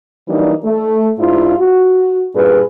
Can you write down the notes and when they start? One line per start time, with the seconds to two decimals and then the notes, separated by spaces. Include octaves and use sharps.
0.28 E3 F#3 G3 A#3 D4 D#4
0.64 A3
1.19 G#2 D4 E4 F4
1.59 F#4
2.35 G2 A#2 G#4 B4